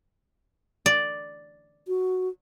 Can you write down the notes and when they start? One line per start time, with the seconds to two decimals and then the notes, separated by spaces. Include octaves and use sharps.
0.86 D5
1.88 F#4